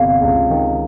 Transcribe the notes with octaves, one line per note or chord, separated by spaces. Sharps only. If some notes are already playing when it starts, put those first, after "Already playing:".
Already playing: G1 C3 F5
C#2
D#3